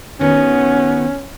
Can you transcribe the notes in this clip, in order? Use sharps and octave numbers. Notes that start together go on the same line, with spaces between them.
D#3 B3 C#4 F#4